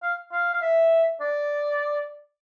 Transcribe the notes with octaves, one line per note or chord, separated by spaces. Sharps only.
F5
F5
F5
E5
D5